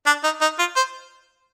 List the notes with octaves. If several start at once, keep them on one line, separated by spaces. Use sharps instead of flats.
D4
D#4
D#4
F4
C5